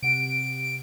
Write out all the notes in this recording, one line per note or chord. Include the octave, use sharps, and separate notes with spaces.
C3 F#5 D7